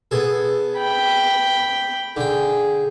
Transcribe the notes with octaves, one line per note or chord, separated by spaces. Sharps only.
B3 G#4 A4
G5 B5
D3 G#4 G5